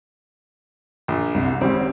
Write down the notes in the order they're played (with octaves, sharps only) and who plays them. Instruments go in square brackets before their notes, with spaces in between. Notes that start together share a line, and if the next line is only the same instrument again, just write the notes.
[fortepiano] A#1
[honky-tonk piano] C2 C3
[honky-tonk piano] G#1 [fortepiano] C#3 G3 C4